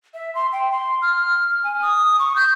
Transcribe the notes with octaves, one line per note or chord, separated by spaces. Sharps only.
E5
C6
G5
C6
F6
G#5
D#6
C#6
G6